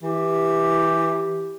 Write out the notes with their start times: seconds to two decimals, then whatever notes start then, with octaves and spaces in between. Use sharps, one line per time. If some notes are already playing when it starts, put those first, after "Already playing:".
0.03 E3 G4